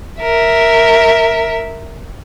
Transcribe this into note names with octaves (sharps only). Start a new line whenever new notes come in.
A#4 E5